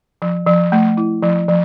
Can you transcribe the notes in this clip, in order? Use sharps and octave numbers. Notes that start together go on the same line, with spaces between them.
F3
F3
A3
E4
F3
F3